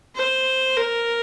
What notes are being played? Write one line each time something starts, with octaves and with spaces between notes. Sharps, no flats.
C5
A#4